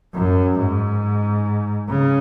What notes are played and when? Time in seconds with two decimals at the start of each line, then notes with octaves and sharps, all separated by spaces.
0.14 F#2
0.58 G#2
1.89 C#3